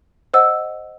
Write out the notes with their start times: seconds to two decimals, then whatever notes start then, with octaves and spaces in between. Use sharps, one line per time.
0.34 C5 D#5 F#5 E6